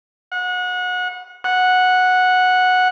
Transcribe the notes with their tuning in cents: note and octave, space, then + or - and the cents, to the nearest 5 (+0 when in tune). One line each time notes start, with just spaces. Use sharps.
F#5 -30
F#5 -10